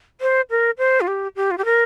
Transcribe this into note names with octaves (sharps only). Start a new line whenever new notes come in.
C5
A#4
C5
F4
G4
G4
F4
G4
A#4